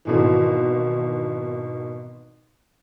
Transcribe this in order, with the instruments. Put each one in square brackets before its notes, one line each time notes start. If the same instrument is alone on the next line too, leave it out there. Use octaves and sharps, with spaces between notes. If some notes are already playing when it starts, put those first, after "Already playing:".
[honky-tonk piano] G#1 B2 E3